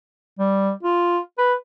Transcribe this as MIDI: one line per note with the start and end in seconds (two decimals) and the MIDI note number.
0.39 0.72 55
0.83 1.19 65
1.38 1.54 71